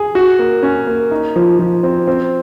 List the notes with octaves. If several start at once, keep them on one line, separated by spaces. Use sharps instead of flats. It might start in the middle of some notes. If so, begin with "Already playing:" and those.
Already playing: G#4
F#4
A#3
C#4
A#3
D#4
F3
F3
C4
C4